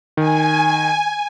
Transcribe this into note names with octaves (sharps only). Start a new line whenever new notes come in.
D#3 G#5